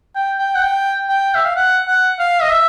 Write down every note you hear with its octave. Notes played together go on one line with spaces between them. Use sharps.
G5
G5
F#5
G5
G5
E5
F5
F#5
F#5
F5
D#5
E5